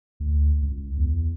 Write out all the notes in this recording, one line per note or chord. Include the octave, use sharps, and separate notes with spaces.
D2
C#2
E2